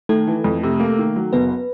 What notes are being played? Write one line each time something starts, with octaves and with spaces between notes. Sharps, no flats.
D#3 A3 A4
E3
F2
C3
A#3
D#3
F#3
F#1 B3 B4